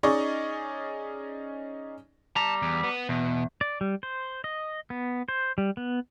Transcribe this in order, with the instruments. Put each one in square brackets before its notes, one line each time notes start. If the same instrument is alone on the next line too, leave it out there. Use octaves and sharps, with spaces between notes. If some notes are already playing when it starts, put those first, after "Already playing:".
[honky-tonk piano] C#4 D#4 G#4 D5 D#5 C#6
[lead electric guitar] G3 A#5 [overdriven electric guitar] A5
[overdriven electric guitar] E2
B3
[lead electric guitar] E2 [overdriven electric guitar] B2
[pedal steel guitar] D5
G3
C5
D#5
B3
C5
G3
B3